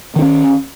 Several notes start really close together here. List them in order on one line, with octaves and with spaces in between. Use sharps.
D#3 D4 C#4